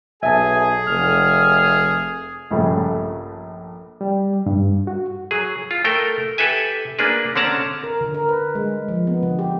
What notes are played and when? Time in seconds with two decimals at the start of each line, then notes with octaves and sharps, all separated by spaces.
0.23 B1 G#4 E5 G#5 A5
0.88 F1 F6
2.51 A#1 G2 C#3 A3
4.01 G3
4.46 G2
4.87 F#4
5.31 F#3 G#4
5.71 F4
5.84 A3 A4 A#4 G5
6.38 G4 A4 B4 E5 G#5
6.99 A#3 D4 G#4 B4
7.36 D3 C4 C#4 D5 A5 A#5
7.84 A#4
8.01 D3
8.14 A#4
8.29 B4
8.55 G#3
8.89 F3
9.07 B3
9.23 D3
9.39 G4